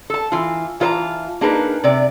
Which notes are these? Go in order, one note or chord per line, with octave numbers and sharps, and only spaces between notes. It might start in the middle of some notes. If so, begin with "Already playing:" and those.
A4 A5
E3 F4
E3 F4 A4 C5 A5 A#5
A#3 D4 D#4 G#4 A#4 B4
C3 D5